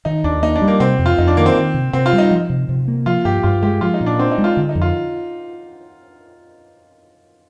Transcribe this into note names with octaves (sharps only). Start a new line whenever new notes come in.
D#3 D#4
D#2 D4
A#3 D#4
D4
G3
A#3
C3 C4
F2
F4
F2 D#4
D4
D#3 A#3
C4
D#3
C3
C3 C4
F4
G3
D#4
F3
C3
C3
A#3
F3 F4
G2 G4
G2 F4
G#3 G4
F3 F4
D#4
A#2
D4
C4 D4
D#4
G#3
F4
D3
D#4
F2
F4